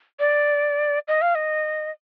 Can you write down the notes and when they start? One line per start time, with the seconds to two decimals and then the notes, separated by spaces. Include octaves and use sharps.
0.19 D5
1.08 D#5
1.22 F5
1.35 D#5